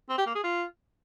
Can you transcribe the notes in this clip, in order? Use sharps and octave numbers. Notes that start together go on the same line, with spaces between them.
C4
G4
A#3
G#4
F4